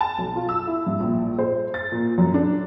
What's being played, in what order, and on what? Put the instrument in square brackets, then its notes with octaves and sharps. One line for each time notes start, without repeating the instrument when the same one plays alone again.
[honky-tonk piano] A5
B1
F4
E6
E4
G2
A#1
C5
A6
A#2
F#2
D4